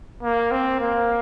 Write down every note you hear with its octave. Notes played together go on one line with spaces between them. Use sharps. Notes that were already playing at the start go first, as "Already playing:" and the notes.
A#3
C4
A#3